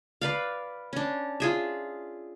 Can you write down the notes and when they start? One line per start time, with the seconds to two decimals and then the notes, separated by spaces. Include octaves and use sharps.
0.21 B4 D5 F5
0.93 C#4 D4
1.40 F4 G#4 E5